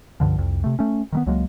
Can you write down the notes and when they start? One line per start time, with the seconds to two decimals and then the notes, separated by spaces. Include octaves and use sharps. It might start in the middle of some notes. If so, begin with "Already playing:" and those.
0.20 C#2 G2 D3 F3
0.38 C2 F2
0.64 C3 A3
0.79 A3 C#4
1.12 D#3 G3 B3
1.26 C#2 F#3 G#3 A#3